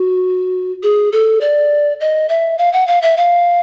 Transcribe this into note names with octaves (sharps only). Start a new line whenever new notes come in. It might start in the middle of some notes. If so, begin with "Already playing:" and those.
Already playing: F#4
G#4
A4
D5
D#5
E5
F5
F#5
F5
E5
F5